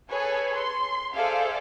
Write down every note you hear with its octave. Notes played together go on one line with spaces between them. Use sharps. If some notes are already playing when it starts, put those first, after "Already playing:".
G#4 A4 B4 C#5 G#5
C6
G#4 A4 C5 D5 E5 F5